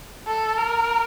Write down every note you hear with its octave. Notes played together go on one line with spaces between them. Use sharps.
A4
A#4